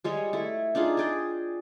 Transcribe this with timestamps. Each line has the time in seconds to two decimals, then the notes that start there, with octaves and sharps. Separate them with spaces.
0.04 G3 G#3 G#4 C#5
0.33 A3 E4
0.75 D4 D#4 F4 G#4
0.97 G#4 D5 G5